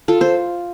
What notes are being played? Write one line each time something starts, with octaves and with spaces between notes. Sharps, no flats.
F4 A4
A4 C5